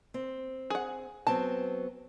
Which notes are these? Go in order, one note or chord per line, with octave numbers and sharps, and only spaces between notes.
C4
G#4 F#5
F#3 B3 C4 A5